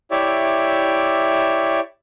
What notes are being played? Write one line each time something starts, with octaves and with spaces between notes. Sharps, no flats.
E4 G4 C#5 D5 E5